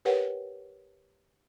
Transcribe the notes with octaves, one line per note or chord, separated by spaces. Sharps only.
G4 A#4 B4 C#5 F#5 G5